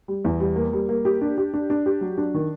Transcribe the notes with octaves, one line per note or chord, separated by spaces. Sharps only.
G3
E2
G3
A#3
G3
A#3
G4
D4
G4
D4
D4
G4
F#3
D4
D#3